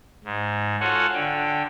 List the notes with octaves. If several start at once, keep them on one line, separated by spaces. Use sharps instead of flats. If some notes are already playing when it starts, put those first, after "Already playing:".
G#2
F4 F#4 A4 C#5 F#5 G#5
D3 G5